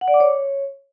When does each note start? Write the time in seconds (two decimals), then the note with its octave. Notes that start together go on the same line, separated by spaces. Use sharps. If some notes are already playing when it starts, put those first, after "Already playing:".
0.01 F#5
0.08 D5
0.14 D6
0.20 C#5